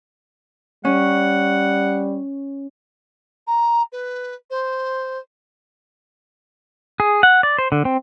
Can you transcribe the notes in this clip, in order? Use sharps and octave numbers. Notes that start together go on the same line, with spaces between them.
G3 C#4 F#5
A#5
B4
C5
G#4
F#5
D5
C5
D3
C4